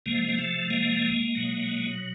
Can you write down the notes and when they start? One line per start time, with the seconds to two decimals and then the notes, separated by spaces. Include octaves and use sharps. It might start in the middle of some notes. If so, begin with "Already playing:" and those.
0.06 C3 F3 G#3 A#3
0.29 A#3
0.39 A3
0.70 G#3 A#3
1.35 B2 F#3